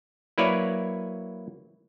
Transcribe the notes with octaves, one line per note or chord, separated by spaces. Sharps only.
F#3 A#3 E4 B4 C#5 D5